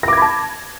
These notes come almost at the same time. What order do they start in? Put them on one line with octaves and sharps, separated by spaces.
A#6 D6 G#6 B5 A5